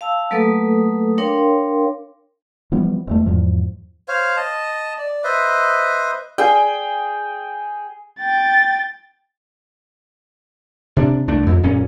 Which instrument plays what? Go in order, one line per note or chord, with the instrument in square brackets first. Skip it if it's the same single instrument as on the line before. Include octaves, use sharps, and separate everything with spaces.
[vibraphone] F5 A5 E6
F#3 A3 A#3 A4 B4 D#6
D4 A#4 C#5 F5 G5 C6
[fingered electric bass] E3 F3 G3 B3
E1 E2 A3
E2 G#2 F3
[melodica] C5 C#5 F5
D#5 A5
D5
B4 C5 D#5 E5
[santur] G#4 G5
[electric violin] G5 A6
[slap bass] C3 D4
C2 A3 D4
F2
D#1 F#2 A#2 C#4